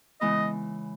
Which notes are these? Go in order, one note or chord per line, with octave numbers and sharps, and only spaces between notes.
C#3 E3 G#3 B3 E4 D#5